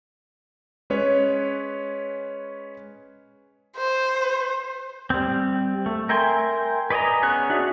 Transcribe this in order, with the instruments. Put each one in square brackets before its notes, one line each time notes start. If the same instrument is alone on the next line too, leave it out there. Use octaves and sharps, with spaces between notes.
[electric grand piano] G#3 C#4 B4 C#5
[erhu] C5
[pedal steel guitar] G3 C4
A3
A#4 E5 G5 G#5 C6
B4 D5 D#5 G#5 A#5
B3 C#4 G#4 C#5 F#6
D4 F#4 G#4 D5 E5